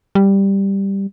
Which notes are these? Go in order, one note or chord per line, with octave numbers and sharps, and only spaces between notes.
G3